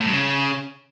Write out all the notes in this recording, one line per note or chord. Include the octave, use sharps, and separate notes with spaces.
A2
G2
C#3